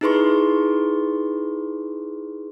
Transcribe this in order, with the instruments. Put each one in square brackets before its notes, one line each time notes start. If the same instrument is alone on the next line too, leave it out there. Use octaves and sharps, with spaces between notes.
[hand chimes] D#4 E4 G#4 B4 C6 C#6